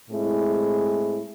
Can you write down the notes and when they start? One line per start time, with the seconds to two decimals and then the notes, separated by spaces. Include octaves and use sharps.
0.10 A2 G#3 C4 E4 G#4